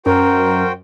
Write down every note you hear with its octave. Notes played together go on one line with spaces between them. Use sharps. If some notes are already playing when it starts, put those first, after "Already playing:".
F#2 F#4 A#4 C5 G5